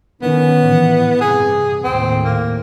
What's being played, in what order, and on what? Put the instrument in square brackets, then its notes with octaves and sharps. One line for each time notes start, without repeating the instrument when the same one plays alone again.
[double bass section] D#3 C#4 [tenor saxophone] B3
[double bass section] A1 E3
[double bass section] G2 C3 [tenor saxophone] G#4
[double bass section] D#2 A2 [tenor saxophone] C4
[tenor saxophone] A#3